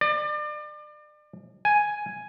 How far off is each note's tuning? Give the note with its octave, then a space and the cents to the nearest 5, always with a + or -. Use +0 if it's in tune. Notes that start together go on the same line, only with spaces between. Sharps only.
D5 +35
G#5 +5